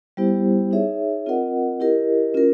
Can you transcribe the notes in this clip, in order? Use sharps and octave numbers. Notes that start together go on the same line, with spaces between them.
G3 B3 E4 G4 C5
D#4 G#4 C#5 E5
C4 F4 A#4 D#5 F#5
E4 G4 A#4 D#5
C#4 F4 A#4